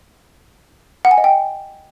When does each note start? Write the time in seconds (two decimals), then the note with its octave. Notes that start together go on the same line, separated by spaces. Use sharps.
1.05 F#5
1.11 G#5
1.18 D#5
1.24 G5